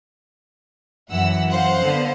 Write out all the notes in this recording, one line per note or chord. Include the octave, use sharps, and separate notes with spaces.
F#2 E3 F#5 E6
C5 F5 F#5
D3 B3